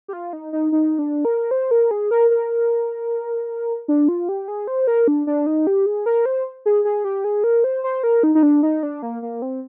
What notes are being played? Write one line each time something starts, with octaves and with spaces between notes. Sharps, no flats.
G4
F4
D#4
D#4
D#4
D4
A#4
C5
A#4
G#4
A#4
A#4
D4
F4
G4
G#4
C5
A#4
D4
D4
D#4
G4
G#4
A#4
C5
G#4
G#4
G4
G#4
A#4
C5
C5
A#4
D#4
D#4
D4
D#4
D4
A#3
A#3
C4